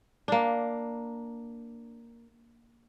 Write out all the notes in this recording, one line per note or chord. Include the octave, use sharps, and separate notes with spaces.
A#3 D4